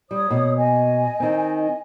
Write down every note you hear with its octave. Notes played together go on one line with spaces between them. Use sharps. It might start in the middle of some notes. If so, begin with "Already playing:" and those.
G3 C#5 D#6
B2 A#3
D#5 G#5
D#3 C4